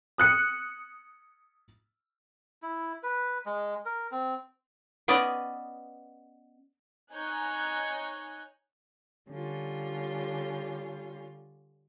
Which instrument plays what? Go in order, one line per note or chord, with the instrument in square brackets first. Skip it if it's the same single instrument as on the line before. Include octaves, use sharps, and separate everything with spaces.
[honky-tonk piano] D#6 F#6 C#7
[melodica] E4
B4
G#3
A#4
C4
[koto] B3 C#4 D5 D#5
[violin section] D#4 C#5 G#5 A#5 F#6 G6
[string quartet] D3 G3 C#4 F4